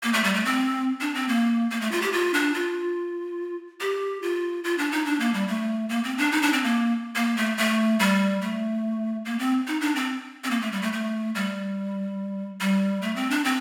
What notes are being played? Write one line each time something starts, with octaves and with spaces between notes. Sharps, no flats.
A#3
A3
G3
A3
C4
D4
C4
A#3
A#3
A3
F4
G4
F4
D4
F4
G4
F4
F4
D4
D#4
D4
A#3
G3
A3
A#3
C4
D4
D#4
D4
C4
A#3
A#3
A3
A3
G3
A3
A#3
C4
D#4
D4
C4
C4
A#3
A3
G3
A3
A3
G3
G3
A3
C4
D4
C4